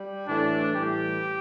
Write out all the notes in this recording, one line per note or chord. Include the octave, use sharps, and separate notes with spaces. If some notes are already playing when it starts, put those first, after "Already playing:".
Already playing: G3
A2 E3 A3 D4
A2 E3 G3 G4